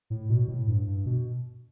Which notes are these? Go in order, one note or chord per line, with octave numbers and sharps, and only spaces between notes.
A2
B2
A2
G2
G2
B2